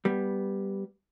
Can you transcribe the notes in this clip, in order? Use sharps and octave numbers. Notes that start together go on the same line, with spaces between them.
G3 B3